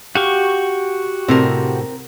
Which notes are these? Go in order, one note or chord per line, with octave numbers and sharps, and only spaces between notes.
F#4 G4 F5 C#6
A2 C3 C4 A#4